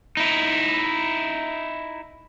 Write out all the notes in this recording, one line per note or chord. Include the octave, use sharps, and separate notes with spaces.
D#4 E4